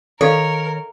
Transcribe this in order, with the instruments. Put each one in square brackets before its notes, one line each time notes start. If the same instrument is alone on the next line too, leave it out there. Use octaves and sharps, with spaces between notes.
[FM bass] D#3 [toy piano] A4 D#5 F5 [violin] A#4 [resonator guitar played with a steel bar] C#5